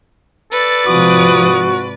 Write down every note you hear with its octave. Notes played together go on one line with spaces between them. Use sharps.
A4 B4 D5
G#2 C3 F3 F#4 D#6